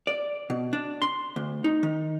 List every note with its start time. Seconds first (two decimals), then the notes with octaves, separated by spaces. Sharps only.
0.07 D5
0.50 B2
0.73 D4
1.02 C6
1.36 D2
1.64 D#4
1.83 D#3